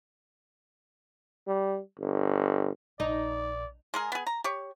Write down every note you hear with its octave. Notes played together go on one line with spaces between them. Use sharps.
G3
G1
A#1 D#4 D5
G#3 G#4 A#4
B3 G#4
A#5
G4 C#5